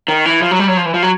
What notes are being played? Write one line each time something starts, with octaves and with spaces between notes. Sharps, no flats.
D#3
E3
F3
F#3
G3
F#3
F3
E3
F3
F#3